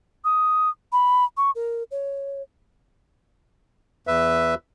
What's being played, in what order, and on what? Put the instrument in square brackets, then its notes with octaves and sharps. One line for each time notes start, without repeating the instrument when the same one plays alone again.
[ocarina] D#6
B5
C#6
A#4
C#5
[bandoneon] E2 B4 E5